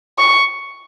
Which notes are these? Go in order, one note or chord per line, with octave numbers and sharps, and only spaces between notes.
C#6